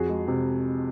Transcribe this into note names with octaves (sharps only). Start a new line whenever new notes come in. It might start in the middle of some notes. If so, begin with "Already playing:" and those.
Already playing: F2 F#4 G#4
G#3
C3